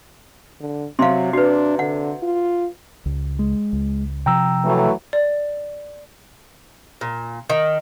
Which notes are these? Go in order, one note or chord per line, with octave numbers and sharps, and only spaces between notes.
D3
C3 F#3 F5 C6
D4 F#4 B4
D3 F#5
F4
C#2
G#3
C#2
C3 F3 G5 A#5 E6
E3 F#3 A3
D5
A#2
D#3